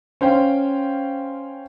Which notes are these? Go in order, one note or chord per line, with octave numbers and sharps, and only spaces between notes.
C#4 C5 F5 G5